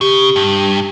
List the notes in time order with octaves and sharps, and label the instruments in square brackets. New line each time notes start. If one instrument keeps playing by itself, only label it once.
[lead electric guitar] C#3 [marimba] G4
[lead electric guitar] G2